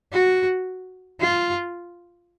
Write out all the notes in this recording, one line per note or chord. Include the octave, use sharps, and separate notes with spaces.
F#4
F4